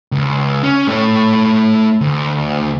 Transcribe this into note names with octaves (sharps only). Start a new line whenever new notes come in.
C#2
C#4
A3 C#5
D2